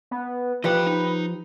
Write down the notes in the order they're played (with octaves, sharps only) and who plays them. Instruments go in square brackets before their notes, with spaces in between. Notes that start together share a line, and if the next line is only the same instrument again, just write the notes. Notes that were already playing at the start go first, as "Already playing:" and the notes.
[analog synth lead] B3
[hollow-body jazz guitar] F3 G4 [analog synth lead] B4 [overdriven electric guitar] D#5 G5
[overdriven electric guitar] D#4